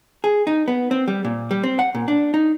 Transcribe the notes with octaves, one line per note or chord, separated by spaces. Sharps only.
G#4
D#4
B3
C4
G3
A#2
G3
C4
F#5
A#2
D4
D#4